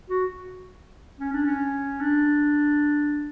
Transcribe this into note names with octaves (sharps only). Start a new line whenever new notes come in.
F#4
C#4
D4
C#4
D4